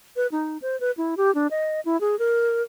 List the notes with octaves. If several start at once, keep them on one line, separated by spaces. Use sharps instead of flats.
B4
D#4
C5
B4
E4
G4
D4
D#5
E4
G#4
A#4